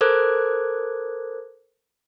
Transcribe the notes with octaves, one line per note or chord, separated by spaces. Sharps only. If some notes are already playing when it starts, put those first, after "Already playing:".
A4 A#4 C5 D6 F#6 G#6